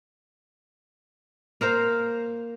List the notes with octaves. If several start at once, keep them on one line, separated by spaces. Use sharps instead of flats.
A#3 A#4 C5 F5